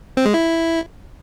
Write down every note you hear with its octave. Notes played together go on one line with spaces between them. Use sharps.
C4
G#3
E4